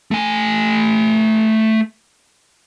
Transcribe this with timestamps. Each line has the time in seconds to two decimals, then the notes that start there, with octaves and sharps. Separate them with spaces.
0.11 A3 G#5